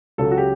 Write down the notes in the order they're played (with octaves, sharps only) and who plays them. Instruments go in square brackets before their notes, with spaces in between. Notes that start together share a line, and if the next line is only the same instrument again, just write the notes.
[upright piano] C#2 C#3 F#3 A4
F#4
G4